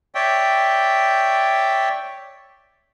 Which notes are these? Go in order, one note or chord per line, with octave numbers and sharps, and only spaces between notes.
C#5 D5 E5 G5